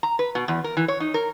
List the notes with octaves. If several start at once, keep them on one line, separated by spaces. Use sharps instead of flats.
A#5
B4
B2
E2
A#4
E3
C#5
D#4
A#4